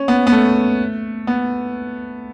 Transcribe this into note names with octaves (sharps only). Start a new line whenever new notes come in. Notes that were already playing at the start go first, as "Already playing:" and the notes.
Already playing: C#4
B3
B3
A3
B3